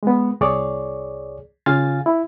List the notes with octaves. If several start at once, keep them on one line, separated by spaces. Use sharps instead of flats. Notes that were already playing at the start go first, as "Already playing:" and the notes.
G#3 B3
C2 G#4 C#5 D5
C#3 F4 F5 G#5 A6
E4